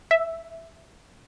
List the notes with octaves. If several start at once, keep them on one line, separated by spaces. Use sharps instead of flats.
E5